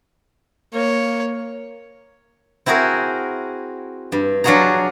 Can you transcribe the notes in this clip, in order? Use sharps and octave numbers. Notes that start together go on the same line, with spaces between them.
A#3 C#5
C4 E4 F#4 G#4 A#4
G2
F#3 D4 F4 F#4 G#4 A#5